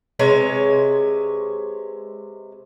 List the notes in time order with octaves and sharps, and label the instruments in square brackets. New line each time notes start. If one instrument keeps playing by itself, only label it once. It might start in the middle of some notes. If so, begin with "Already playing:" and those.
[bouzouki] C3 G#3 B4 C#5